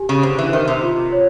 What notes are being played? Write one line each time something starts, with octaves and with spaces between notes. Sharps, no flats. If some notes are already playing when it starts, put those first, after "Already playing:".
Already playing: G4 G#5
C#3
D3 C5
E3
D#3 C5
C3
F4
C#5